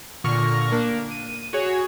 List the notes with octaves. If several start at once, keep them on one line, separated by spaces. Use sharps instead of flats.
A#2 D3 C#6 F6 A#6
A#3 D4
D#7
F#4 G#4 C#5